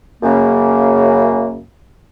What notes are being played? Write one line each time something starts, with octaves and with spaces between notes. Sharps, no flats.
F#2 C#3 A#3